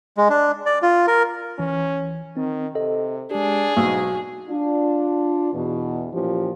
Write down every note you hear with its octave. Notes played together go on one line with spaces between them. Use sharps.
G#3
D4
D5
F4
A#4
G#1 E3 C#4
D#3 C4
C3 A4 D#5
G#3 D4 G4 G#4
B1 G#2 C#6 E6
D4 F4
E2 B2
A#2 E3 F3 C#4 G4